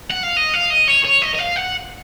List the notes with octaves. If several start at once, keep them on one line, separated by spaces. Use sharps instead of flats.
F#5
F5
D#5
F5
D#5
C#5
C#5
D#5
D#5
F5
F#5